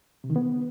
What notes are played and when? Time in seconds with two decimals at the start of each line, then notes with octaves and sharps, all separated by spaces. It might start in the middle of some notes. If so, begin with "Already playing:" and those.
0.24 C3
0.30 D#3
0.36 B3